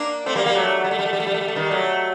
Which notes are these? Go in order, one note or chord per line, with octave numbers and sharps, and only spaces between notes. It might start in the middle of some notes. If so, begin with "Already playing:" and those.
Already playing: A#3 D4
A3 C4
G3 A#3
G3 A#3
F#3 A3
G3
A3
G3
A3
G3
A3
G3
A3
G3
A3
D#3 G3
F#3 A3